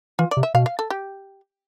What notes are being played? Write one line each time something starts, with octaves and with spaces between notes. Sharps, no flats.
E3 F4
D5
C3
E5
B2 F5
F5
A4
G4